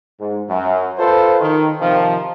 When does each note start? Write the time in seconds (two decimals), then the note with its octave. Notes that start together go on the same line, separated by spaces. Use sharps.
0.20 G#2
0.49 F#2
0.98 F4 A4 B4 C5
1.41 D#3
1.81 C3 D#3 F3